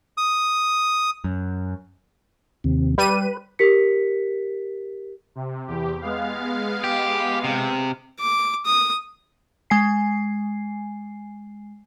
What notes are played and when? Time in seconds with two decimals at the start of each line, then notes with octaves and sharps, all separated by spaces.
0.18 D#6
1.24 F#2
2.64 D#2 C3
2.98 G3 B4 D#7
3.59 G4 A#4 B6 C#7
5.35 C3
5.68 E2 G4
6.02 G#3 B3 F5
6.84 G4
7.44 C3
8.20 D6
8.66 D#6
9.70 G#3 G#5 C7